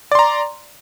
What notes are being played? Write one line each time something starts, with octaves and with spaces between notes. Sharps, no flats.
D5 A#5 C6